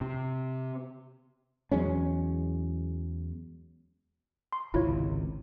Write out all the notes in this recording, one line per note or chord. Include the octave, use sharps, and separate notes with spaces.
C3
E2 F#3 G#3 C#4
C6
G#1 C#2 C3 E4 F4 C#5